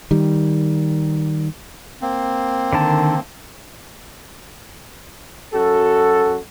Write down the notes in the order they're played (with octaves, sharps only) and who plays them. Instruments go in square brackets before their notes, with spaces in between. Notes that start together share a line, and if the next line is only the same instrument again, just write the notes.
[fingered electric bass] D#3 G3
[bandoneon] A#3 C4
[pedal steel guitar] D3 D#3 A5
[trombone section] F#2 F#4 A4